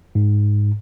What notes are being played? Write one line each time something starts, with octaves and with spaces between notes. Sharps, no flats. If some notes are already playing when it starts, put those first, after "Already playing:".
G#2